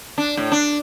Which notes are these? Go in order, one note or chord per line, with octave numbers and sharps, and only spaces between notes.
D4
A2
D4